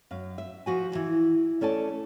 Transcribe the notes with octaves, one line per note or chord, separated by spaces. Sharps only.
F#2 F5
E5
F3 F#4 G#5
D#2 E3
A3 C#4 A4 D5 A5